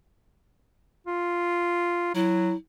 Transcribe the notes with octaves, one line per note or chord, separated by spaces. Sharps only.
F4
F#3 E4